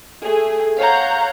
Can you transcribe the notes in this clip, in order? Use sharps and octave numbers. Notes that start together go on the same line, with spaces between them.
A3 G#4
C#5 F5 F#5 A#5 G6